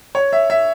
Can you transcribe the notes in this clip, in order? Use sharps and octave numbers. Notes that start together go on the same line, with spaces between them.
C#5
E5
E5